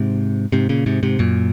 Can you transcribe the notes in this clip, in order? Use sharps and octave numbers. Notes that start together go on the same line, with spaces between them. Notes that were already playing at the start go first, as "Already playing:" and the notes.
Already playing: G#2 C3
G#2 C3
A#2 C#3
G#2 C3
G#2 C3
F#2 A#2